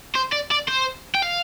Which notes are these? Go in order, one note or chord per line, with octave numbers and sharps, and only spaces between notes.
C5
D5
D5
C5
G5
F5